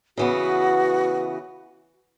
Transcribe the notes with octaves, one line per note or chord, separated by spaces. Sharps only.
C#3 E3 B3 F#4